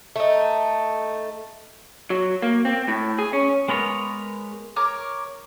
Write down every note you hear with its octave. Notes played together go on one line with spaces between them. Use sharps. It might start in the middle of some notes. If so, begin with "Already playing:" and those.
A3 D#4
F#3
A#3
C4
A2
G#4
C#4
G#3 B3 A#4 C#5
A#4 C#5 D6